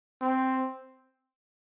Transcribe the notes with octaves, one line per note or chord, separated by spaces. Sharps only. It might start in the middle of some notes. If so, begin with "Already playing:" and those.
C4